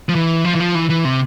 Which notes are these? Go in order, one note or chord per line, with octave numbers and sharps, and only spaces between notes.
F3
E3
F3
E3
F3
E3
E3
C3